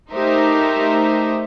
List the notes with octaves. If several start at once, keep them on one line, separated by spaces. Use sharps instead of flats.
A3 D#4 G4 A#4 C5 E5